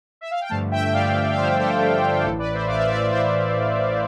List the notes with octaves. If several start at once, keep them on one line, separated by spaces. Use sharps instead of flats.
E5
F5
G5
G2 D3 F3 A3 F5 A5
E5 G5
G2 D3 F3 A3 D5 F5
F5
G2 D3 F3 A3 C5 E5
A4 C5
G2 D3 F3 A3
A1 A2 E3 A4 C5
B4 D5
C5 E5
A1 A2 E3 D5 F5
C5 E5
B4 D5
A1 A2 E3 C5 E5
A1 A2 E3